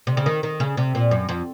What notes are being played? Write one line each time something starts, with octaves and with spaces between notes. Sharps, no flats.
C3
C#3
D#3
D#3
C#3
C3
A#2
F#2
F2